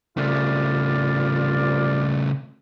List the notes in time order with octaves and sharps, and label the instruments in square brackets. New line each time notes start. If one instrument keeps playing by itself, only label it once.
[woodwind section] C2 F4 D5 [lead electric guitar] C#3 A3